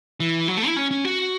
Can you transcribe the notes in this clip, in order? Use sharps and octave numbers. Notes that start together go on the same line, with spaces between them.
E3
F#3
A3
E4
C#4
C#4
F#4